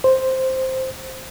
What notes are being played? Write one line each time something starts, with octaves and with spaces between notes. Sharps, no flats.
C5